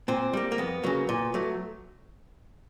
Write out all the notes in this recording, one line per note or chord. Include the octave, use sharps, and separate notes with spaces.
A#2 C4
G3 A#3
A#3
F2 B3
C#3 F#3 A#3
A#2
F#3 A3